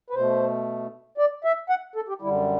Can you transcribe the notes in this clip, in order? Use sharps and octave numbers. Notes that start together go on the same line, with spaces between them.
B4
B2 A3 C5
D5
E5
F#5
A4
G4
F#2 D3 G3 E4